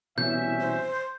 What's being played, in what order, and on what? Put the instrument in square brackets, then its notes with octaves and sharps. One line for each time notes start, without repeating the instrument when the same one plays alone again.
[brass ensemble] C2 C#4 E5 [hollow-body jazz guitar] B2 E3 [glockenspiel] G6
[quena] C5